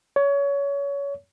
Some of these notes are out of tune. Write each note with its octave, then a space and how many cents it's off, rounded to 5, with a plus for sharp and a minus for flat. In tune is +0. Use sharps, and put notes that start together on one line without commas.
C#5 +25